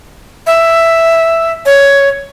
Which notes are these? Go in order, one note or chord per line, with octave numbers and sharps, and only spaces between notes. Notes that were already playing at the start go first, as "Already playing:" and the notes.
E5
C#5